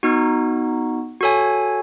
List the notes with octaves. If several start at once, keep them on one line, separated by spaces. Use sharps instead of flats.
B3 D#4 F#4
F#4 A4 C#5 G#5